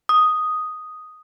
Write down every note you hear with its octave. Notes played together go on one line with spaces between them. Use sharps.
D#6